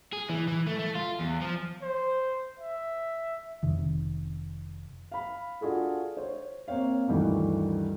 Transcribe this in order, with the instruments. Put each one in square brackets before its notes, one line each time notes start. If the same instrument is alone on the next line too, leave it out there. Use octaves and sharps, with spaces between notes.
[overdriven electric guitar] G#4
E3
E3
A3
A3
F4
E2
F3
[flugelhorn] C5
E5
[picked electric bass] F1 C3 D#3
[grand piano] F5 B5
D4 F4 F#4 G#4 A4
C5 C#5
A#3 C4 C#5 F5
D2 G2 D#3 E3